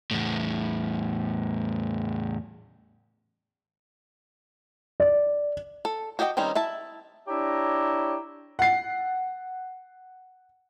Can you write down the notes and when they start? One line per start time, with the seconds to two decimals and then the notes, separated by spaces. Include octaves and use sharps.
0.11 E2 A2
5.00 D5
5.85 A4
6.19 F#4 G4 D#5 E5 G5
6.37 D#3 G3 C4 C#4 D#4
6.55 E4 E5 A5
7.28 D4 E4 G4 C#5 A#5
8.59 F#5 C7